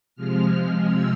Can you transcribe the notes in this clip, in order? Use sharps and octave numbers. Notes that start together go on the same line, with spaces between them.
C3 F3 G#3 F6
E6